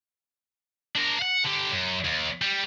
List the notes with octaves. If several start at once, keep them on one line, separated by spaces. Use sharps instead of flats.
D4 A#4
F5 F#5
D3 G4
F#2
D#2
G3